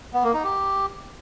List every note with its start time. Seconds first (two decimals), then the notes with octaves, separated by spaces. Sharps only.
0.14 B3
0.24 A#3
0.34 D#4
0.44 G4